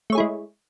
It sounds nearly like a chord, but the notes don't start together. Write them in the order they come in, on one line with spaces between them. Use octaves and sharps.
A3 C#5 G#4 E4 G#3